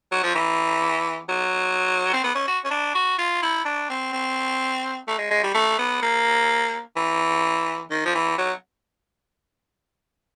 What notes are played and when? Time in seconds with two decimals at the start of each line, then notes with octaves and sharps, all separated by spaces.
0.12 F#3
0.23 F3
0.35 E3
1.29 F#3
2.13 C4
2.24 B3
2.35 C#4
2.48 F#4
2.65 C#4
2.71 D4
2.95 F#4
3.18 F4
3.42 E4
3.65 D4
3.90 C4
4.13 C4
5.07 A3
5.18 G#3
5.31 G#3
5.43 G3
5.54 A3
5.78 B3
6.02 A#3
6.96 E3
7.91 D#3
8.05 F3
8.15 E3
8.38 F#3